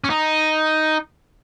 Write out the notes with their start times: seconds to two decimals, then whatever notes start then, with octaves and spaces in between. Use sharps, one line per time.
0.04 C#4
0.10 D#4